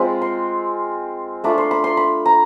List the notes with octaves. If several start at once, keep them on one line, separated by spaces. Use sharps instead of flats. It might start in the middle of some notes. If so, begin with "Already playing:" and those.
Already playing: G#3 C4 F4 B5
C6
A3 D4 F4 B5
C6
B5
C6
B5
A#5